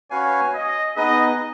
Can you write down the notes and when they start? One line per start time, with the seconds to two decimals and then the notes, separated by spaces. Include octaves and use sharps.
0.10 C#4 F#4 B4 C#5 F5 G#5
0.54 D#5
0.96 B3 D#4 G#4 B4 D#5